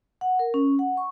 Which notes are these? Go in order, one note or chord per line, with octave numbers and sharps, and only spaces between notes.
F#5
A#4
C#4
F#5
C#6